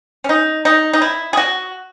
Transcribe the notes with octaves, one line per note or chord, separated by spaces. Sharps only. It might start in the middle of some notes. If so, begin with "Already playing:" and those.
C#4
D#4
D#4
D#4
E4
G#4
F#4